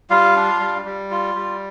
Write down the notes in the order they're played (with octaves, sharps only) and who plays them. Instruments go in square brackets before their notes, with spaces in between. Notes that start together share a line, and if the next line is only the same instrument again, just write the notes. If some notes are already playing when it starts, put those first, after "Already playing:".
[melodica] G3 F4 F5
D4
G3
G3
F4
G3